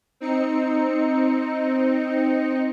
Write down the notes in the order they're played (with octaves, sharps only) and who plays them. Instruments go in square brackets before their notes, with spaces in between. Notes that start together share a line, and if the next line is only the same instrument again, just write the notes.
[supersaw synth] C4 D#4 C#7